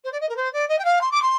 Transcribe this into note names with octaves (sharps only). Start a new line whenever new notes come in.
C5
D5
D#5
A#4
C5
D5
D#5
G5
F5
C6
D6
C6